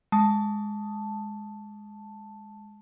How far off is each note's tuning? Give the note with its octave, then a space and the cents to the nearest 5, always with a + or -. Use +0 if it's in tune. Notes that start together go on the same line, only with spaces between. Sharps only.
G#3 +0 A5 +0